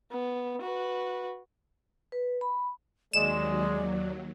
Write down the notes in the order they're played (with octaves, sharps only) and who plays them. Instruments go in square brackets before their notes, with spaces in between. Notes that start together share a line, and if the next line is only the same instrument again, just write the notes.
[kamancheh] B3
F#4 B4
[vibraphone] B4
B5
[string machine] D#2 F#3 [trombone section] G#3 [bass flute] D5 [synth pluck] E7